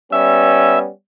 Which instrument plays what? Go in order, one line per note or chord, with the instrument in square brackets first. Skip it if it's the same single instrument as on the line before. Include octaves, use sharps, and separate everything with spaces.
[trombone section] G3 B3 C#4 [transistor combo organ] E5